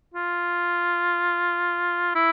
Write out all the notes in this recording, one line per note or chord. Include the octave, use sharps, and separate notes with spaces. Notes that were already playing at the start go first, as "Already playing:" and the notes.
F4
E4